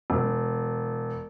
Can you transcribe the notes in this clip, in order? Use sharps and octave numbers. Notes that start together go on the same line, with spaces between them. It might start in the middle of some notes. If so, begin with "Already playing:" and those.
E1